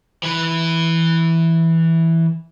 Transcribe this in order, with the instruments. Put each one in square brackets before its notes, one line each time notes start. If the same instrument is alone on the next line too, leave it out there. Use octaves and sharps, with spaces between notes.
[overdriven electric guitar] E3 B4